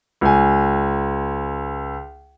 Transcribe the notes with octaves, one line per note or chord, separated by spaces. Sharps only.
C#2 G#5